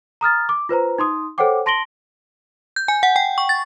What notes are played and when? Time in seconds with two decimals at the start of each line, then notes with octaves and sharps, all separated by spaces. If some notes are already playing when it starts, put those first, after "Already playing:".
0.21 A#5 D#6 F6 A6
0.49 D6
0.69 F4 B4 C5 A#5
0.98 D#4 C6 D#6
1.38 A4 C5 C#5 F#5 G5 D6
1.66 A5 C6 A#6 D7 F#7 G7
2.76 G6
2.88 G#5
3.03 F#5
3.16 G5
3.38 C#6
3.49 A6